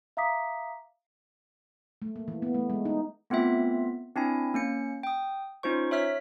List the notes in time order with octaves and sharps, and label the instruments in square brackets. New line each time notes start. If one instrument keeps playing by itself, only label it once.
[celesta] E5 F5 A#5 D6 D#6 B6
[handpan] A3
A#3
E3
B3
A3
G#3
D#4
[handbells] A3 B3 C4 F4 E5
C4 D4 E4 G#5
A#3 C#4 C#7
G5 D#6
C#4 D#4 F4 C5 C#6
C#5 E5 F6 B6